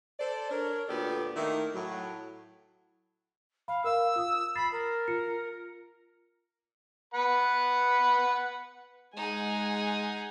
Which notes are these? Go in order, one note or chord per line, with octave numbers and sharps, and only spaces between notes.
A4 C5 D5
D4 A#4 C#5
D2 A#2 B3 G4 A4 D5
D#3 A3 A#3 D#4 E4
A2 F#3
F5 B5
A#4 F5 E6
F4 D#6
B5 A6 C7 E7
A#4
F4 C#7
B4 F#5 B5
G#3 D#4 G#4 F#5 G#5